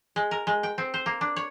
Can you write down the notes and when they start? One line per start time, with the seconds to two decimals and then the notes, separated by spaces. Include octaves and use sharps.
0.16 G#3
0.31 A#4
0.47 G#3
0.63 G5
0.78 C4
0.94 C5
1.06 A#3
1.21 D4
1.36 C#5